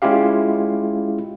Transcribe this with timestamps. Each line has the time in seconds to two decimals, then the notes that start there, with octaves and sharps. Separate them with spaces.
0.02 G#3 C#4 E4 F4 G4 F5